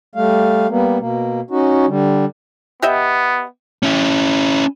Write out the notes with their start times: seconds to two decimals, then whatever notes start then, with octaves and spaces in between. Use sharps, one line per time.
0.16 G3 A3 F5
0.69 G3 A#3 B3
0.99 B2 A#3
1.51 C#4 D#4 F#4
1.87 D3 G3
2.82 B3 G4 D#5 E5
3.83 C#4 E4